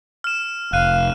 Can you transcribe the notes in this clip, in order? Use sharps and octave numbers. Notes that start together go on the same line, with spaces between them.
F6 E7
F1 F5 F#6 D#7